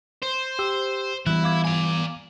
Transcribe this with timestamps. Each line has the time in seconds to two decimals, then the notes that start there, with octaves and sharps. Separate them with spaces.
0.23 C5
0.59 G4 E6
1.27 E3 G3 B3 E4 F#6
1.44 F5 D6 G#6
1.65 D5 G#5